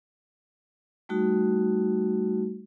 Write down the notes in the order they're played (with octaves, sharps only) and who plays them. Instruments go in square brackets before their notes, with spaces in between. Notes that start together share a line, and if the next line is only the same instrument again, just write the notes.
[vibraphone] G3 A3 D#4 F#4